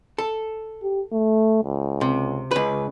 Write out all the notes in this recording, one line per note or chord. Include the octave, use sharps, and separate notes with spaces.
A4
G4
A3
C#2
C3
C#2 B4